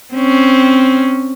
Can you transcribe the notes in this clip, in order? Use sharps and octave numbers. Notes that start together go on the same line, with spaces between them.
C4 C#4